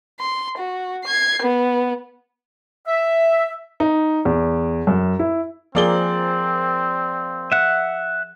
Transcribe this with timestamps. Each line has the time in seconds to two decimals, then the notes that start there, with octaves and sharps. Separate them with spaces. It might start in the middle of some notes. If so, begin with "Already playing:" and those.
0.20 C6
0.58 F#4
1.04 G#6 C7
1.42 B3
2.87 E5
3.80 D#4
4.25 E2
4.87 F#2
5.19 E4
5.75 F3 A#3 C4 G#4 A#4 D5 G7
7.52 E5 F#5